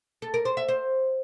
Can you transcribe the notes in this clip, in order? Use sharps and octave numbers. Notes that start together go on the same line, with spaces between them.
A4
A#4
C5
E5
C5